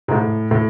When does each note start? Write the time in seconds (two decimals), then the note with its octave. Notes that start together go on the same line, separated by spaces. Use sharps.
0.08 G#2
0.11 A2
0.51 A2